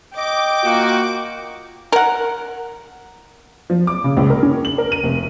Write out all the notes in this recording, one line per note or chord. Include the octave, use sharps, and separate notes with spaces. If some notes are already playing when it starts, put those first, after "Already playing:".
D#5 G5 D6
A#3 F4 F#4
A#4 F#5
F3
D6
C#3
C#2
A#4
C#4
F#7
A#4
D#7
F1